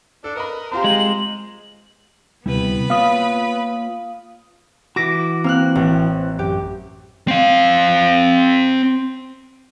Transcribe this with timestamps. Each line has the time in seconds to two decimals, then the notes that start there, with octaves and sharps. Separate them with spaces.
0.24 D4 A4
0.35 A#4 B4 D#5 B5
0.71 C4 F4 G4 C5 A#5
0.84 G#3 F#7
0.98 F#7
2.46 D2 C3 G3 B3 E4 B4 B5
2.90 A#3 F4 C#5 F5 D#6
4.96 E3 F#4 D6 A#6 B6
5.44 A#3 C4 F6 F#6
5.75 A1
6.39 F#2 G4
7.28 C4 F5